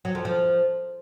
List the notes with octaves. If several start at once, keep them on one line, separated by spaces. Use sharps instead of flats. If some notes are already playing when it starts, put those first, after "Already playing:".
F#3
F2
F3